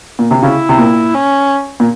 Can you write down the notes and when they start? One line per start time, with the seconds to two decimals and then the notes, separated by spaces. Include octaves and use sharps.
0.19 A#2
0.31 C3
0.43 C#3 E4
0.69 C3
0.78 A#2
1.14 C#4
1.80 A#2